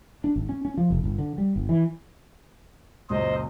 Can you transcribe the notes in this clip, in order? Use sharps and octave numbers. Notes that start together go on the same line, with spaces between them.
D4
G#1
C#4
C#4
F3
F1
G1
D3
G3
G1
E3
C#2 F#2 A#2 C5 D#5